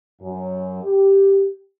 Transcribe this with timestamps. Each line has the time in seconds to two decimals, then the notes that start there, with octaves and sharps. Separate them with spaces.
0.22 F#2
0.83 G4